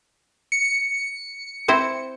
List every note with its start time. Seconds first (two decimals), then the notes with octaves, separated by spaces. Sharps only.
0.52 C#7
1.68 C4 E4 C5